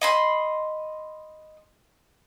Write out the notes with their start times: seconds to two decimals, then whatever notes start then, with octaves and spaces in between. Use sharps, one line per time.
0.01 D#5 B5 C6